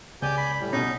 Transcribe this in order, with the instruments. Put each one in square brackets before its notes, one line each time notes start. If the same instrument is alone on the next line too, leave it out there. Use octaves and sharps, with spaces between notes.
[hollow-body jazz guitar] C#2 [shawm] G4 [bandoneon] D5 G#5 G6
[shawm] B5
[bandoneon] A2 G3
[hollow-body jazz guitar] B2 C#4 [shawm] D#4